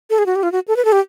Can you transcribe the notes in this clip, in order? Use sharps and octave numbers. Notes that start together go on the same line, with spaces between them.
A4
G#4
F#4
G4
F4
F#4
A4
B4
A4
G4